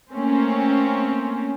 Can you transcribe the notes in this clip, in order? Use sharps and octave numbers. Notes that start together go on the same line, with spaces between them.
A3 A#3 C4 C#4